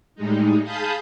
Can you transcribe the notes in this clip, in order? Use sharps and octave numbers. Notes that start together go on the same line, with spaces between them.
A2 G3 G#3 D#4
G#4 F5 A5 B5 D#6 G6